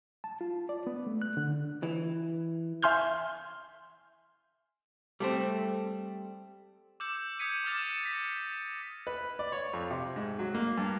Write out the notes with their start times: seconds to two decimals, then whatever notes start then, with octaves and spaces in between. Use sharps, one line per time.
0.24 A5
0.41 F4
0.69 D5
0.87 B3
1.07 A3
1.22 F#6
1.37 D3
1.83 E3
2.82 E5 G#5 C6 F6 G6
5.20 G3 A3 C4
7.00 D6 E6 G6 C#7 E7
7.39 D#6 G6 G#6 B6 C#7 D#7
7.64 D6 D#6 F6 A6 E7
8.04 A#6 B6 C#7
9.07 B4
9.39 D5
9.52 C#5
9.73 F2
9.91 C3
10.16 G#2
10.39 F#3
10.55 A#3
10.78 G2